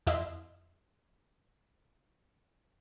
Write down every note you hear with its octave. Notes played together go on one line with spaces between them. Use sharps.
F2 E4 D#5 E5 C6